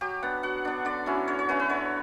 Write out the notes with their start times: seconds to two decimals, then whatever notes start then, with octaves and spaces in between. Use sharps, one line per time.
0.01 F#3 G4
0.23 B3 D4 F#5
0.43 F#3 F#5
0.65 B3 D4
0.85 D3 D5
1.06 F#3 C#4 E4
1.28 D3 C#5
1.39 C#5
1.49 F#3 C#4 E4 B4
1.60 B4
1.69 D3 C#5